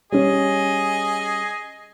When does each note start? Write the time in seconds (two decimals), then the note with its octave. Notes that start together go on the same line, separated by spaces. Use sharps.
0.12 G3 C#4 G#4 D#5